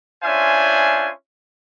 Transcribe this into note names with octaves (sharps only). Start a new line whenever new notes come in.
C#4 D4 F4 C5 E5 G#5